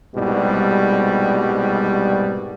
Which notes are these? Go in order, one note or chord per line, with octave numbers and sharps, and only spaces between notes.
C2 G#2 B2 G3